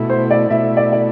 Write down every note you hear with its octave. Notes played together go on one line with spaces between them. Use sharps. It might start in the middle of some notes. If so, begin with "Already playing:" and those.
Already playing: B2 A3 E4
C5
D5
B2 A3 E4 E5
D5
D5